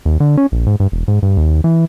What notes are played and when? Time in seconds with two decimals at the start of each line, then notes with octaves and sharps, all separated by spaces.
0.05 D#2
0.20 D3
0.37 C#4
0.52 A#1
0.66 G#2
0.80 G2
0.92 E1
1.08 G#2
1.23 G2
1.37 D#2
1.64 E3